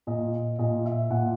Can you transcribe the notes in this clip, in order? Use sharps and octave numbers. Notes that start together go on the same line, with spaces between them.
A#2 D#5
A#2 D#5
E5
A#2 F#5